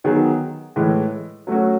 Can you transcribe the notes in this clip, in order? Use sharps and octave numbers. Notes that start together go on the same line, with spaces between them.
D#3 F#3 B3 D#4 G#4
A2 E3 G#3
F#3 A3 C#4 F#4